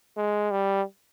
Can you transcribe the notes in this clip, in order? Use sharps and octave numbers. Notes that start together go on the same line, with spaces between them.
G#3
G3